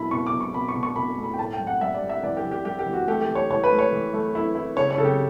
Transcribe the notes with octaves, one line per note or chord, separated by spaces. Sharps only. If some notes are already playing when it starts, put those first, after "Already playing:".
Already playing: B2 E4 B5
B2 C#6
D6
B2
C#6
B2 B5
C#6
B2
C#6
B2 B5
A3
B5
G5
A2 A5
G5
G3
F#5
G3 E5
D5
G3
E5
E3 D5
G4
E3
G4
G3 G4
G4
E3
F#4
A3 G4
G4
E3
C#5
E3 C#5
B4
A3
C#5
E3
A3
E4
E4
C#3 C#5
C#5
C#3 A4
G4